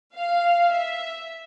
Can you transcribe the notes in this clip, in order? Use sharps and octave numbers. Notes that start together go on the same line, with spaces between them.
F5
E5